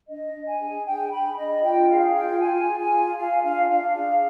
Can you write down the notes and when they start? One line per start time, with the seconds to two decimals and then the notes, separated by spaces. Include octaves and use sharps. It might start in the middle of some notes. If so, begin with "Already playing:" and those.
0.08 D4 D#5
0.35 D4
0.47 G#5
0.60 G#4
0.86 D4 G5
1.12 G#4 B5
1.37 D4 D#5
1.63 F4 G5
1.89 G#4 F5
2.14 F4 G5
2.40 F4 G#5
2.66 G#4
2.79 G#5
2.92 F4
3.17 F4 F5
3.43 D4 F5
3.69 D4 F5
3.94 G#4